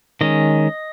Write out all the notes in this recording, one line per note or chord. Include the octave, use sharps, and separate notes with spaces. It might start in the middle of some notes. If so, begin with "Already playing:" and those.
D#3 G#3 C#4 D#5